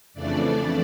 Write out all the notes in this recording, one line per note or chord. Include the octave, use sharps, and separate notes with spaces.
F2 C#3 E3 A3 D4 D5